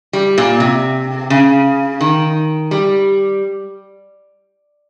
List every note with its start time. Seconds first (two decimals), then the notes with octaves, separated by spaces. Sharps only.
0.13 G3
0.38 A#2
0.60 C3
1.30 C#3
2.01 D#3
2.71 G3